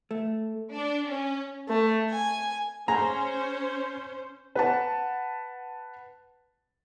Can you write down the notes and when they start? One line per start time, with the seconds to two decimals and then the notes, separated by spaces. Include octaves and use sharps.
0.11 A3
0.71 D4
1.07 C#4
1.69 A3
2.11 G#5
2.88 C#4 G#4 C5 A#5
4.55 B4 F#5 A5